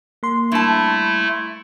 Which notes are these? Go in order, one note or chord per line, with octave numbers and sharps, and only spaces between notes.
A#3 C6
G2 A3 E4 A5